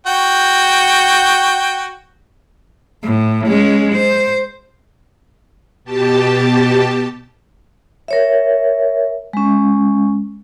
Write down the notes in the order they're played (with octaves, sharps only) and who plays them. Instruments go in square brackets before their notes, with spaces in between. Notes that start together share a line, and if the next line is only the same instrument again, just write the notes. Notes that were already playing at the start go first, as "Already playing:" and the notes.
[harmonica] F#4 G5
[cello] A2
G#3 C#4
C5
[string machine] B2 G4 A5
[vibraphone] A#4 C#5 E5
G#3 C#4